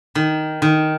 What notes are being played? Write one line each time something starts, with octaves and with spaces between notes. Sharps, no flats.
D#3
D#3